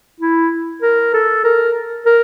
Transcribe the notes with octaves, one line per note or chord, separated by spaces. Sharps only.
E4
A#4
A4
A#4
A#4